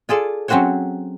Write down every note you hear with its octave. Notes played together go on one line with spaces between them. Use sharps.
F4 G#4 A4 D5
F#3 C4 C#4 F#4 C5 C#5